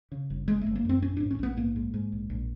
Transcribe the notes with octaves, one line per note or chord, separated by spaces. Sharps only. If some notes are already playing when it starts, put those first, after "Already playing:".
C#3
G1
G1 G#3
A3
G1
A#3
F#2 C4
A#1 C#4
G#2 D4
C#4
A#1 B3
G#2 A#3
G#2
G#2
A#1
A#1